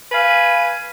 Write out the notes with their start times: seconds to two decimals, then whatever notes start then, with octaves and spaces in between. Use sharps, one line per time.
0.12 B4 F5 G#5